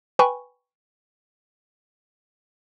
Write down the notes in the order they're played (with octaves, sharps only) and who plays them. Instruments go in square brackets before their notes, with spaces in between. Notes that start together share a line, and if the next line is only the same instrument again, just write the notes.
[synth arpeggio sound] B4 G5 G#5 B5 C#6